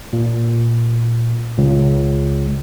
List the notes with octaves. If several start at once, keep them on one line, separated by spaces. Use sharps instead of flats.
A#2
C#2